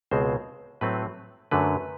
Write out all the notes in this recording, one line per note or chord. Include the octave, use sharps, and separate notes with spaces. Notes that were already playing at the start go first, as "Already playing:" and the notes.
C#2 B2 G#3 C4 C5
A2 F#3 A3 C4 B4
F#2 D3 F#3 A3 B4